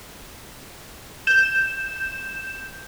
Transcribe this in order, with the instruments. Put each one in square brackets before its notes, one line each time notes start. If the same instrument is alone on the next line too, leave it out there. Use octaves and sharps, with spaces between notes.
[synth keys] G6 E7